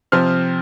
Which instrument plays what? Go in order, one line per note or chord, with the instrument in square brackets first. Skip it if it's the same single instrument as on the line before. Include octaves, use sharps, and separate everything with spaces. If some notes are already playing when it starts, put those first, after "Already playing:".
[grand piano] C3 F3 C4 F6